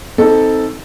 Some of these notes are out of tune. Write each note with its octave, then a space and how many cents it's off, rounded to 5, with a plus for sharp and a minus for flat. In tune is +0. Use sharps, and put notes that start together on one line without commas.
C4 +0 D#4 +20 A4 +0